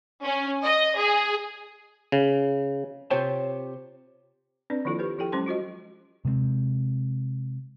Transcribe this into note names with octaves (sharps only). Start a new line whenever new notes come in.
C#4
D#5
G#4
C#3
C3 F4 C5 C#5 G5 A5
C4 D4 B4 D5
D#3 F3 A#3 E4 F4 A4
G4 B4 C5
F3 E4 G4 A4 G5
F#3 G#3 C#4 C5 A5 C6
F4 F#4 C5 D#5
C3 G#3 A3 C4